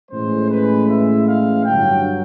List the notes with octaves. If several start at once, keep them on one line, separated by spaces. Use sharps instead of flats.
A2 E3 G#3 C#4 C5
B4
E5
F5
G2 D3 F#3 G5